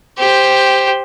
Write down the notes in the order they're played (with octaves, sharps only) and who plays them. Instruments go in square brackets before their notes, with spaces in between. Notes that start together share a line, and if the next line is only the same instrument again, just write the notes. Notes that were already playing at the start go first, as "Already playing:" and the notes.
[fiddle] G4 C5